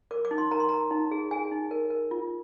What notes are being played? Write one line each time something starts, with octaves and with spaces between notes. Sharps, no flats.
A#4 D6
D6
D#4
C6
A#4 A#5
C6
A#4 A#5
D#4
G#4
G#4 G#5
D#4
A#4
A#4
F4